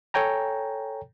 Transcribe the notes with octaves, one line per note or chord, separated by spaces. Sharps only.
A4 C#5 G5 G#5 A#5